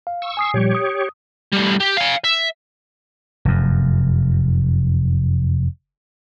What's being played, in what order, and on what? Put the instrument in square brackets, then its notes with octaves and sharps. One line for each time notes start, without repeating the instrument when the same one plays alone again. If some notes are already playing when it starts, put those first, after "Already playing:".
[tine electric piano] F5
[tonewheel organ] C#6 E6
[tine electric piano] G#5 D#6 C7
[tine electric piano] A#2 F3 G3 [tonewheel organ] G4 C#5
[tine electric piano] D#6
[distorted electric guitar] A2 G3
G4
F5 G#5
E5
[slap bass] F1 F#2